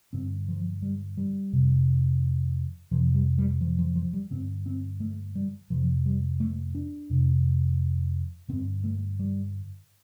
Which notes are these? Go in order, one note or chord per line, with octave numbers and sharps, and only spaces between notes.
G2 D3 C4
F3
G3
G3
F2 C3
F2 C3 F3
G3
G3
F3
F3
F3
G3
G2 D3 C4
C4
A3
G3
F2 C3 F3
G3
A3
D4
F2 C3
G2 D3 C4
A3
G3